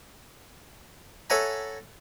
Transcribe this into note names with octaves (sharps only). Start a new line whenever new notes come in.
A4 C#5 E5 F#5 G#5 A#5